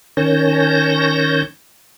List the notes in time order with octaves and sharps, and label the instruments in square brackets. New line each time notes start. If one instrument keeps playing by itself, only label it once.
[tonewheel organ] D#3 C#4 C#5 A5 G6 A#6